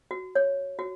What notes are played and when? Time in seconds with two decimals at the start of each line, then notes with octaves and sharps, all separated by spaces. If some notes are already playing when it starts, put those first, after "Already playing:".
0.11 F#4
0.35 C#5
0.79 F#4